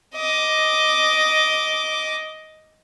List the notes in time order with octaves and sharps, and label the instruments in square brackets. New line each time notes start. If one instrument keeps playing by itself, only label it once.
[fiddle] D#5 D6